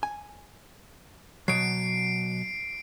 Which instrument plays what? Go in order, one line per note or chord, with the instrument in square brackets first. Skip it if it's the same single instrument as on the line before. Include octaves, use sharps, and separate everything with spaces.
[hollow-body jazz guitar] G#5
[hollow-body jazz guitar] B2 F#3 [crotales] C7 D7